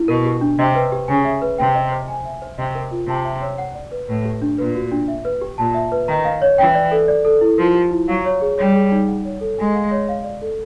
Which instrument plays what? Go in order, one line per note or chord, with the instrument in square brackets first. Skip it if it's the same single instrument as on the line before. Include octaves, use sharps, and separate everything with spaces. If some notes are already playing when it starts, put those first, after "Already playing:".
Already playing: [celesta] E4
[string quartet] B2 [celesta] A#4
[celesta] G4
D4
[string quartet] C3 [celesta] D#5
[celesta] B4
G4
[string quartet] C#3 [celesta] G#5
[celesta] E5
B4
[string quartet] C3 [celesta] G5
[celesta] D#5
C5
G#5
E5
C5
[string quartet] C3 [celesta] D#5
[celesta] A#4
F4
[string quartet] C3 [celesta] A5
[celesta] E5
C#5
F#5
D5
B4
[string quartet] A2 [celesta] B4
[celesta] G4
D4
[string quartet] A#2 [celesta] B4
[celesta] F#4
D4
E5
B4
G4
[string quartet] A#2 [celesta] A5
[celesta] E5
B4
[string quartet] D#3 [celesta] A#5
[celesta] F5
C#5
[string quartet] E3 [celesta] G5
[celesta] D5
A4
D5
A4
E4
[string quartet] F3 [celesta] A#4
[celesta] G4
E4
[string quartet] F#3 [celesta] F5
[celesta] C#5
G#4
[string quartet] G3 [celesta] C#5
[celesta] G#4
D#4
F#5
C#5
A4
[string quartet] G#3 [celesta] G#5
[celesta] F5
C#5
F5
D5
A4